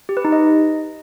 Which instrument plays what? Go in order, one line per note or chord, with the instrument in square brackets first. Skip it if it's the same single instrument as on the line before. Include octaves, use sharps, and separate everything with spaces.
[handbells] G4
B4
D#4
D#5